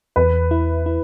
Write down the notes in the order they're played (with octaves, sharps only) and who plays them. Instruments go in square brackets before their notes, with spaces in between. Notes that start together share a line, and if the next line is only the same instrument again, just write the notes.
[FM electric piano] E2 [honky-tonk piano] B4
[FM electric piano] E4
E4